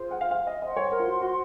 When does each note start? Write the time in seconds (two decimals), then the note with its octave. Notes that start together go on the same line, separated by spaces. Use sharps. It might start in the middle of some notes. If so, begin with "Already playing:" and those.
Already playing: F4 G#4 C5
0.11 F#5
0.21 F5
0.31 F5
0.47 D#5
0.61 C5 D#5 F#5 C6
0.77 C#5
0.92 A#4
0.99 F4
1.07 F#4
1.22 F#4